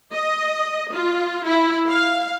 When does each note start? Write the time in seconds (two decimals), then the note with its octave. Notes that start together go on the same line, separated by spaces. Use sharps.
0.13 D#5
0.93 F4
1.46 E4
1.88 F5